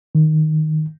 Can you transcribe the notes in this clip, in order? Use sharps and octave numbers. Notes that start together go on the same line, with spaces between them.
D#3